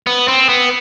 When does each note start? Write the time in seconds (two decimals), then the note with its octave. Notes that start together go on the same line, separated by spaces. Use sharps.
0.07 B3
0.28 C4
0.49 B3